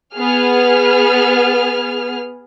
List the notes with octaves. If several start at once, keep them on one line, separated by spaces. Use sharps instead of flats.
B3 G#4 F6